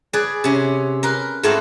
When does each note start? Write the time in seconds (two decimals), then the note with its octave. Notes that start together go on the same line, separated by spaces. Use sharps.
0.13 G#4 B4 D5
0.44 C3 C#4
1.03 A#4 B4 C6
1.43 G#2 A3 C4 F#4 B4 F5